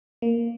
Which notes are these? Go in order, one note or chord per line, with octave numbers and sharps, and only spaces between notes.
A#3